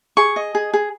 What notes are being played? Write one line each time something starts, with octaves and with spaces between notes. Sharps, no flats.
G#4 C#6
D#5
G#4
G#4